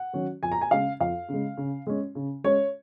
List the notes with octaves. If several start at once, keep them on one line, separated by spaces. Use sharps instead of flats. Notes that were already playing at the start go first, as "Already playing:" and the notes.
Already playing: F#5
D#3 F#3 C#4
F2 G#5
A#5
G#5
C#3 G#3 F5
F2 F5
C#3 G#3
C#3
G#3 C#4
C#3
G#3 C#4 C#5